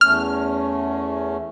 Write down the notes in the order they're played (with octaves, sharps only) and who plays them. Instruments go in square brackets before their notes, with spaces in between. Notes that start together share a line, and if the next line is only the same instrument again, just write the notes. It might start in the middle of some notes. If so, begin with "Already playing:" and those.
[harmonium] E2 A3 C#4 [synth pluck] F6